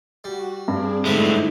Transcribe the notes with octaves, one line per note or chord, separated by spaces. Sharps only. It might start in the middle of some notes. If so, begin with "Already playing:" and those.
G3 F#4
G2 C4 D4 G#4
G#2 D3 G#3 A3 D#4 E4 B5